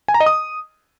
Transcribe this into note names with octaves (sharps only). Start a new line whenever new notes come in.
G#5
A#5
D#5
D#6